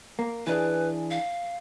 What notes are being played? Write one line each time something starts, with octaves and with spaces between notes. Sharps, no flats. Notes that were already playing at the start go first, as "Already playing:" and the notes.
A#3
E3 D4 G#4 B4
F5